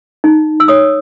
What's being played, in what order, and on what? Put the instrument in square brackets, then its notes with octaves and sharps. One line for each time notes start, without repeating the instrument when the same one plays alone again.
[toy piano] D#4
E6
C#5 D#6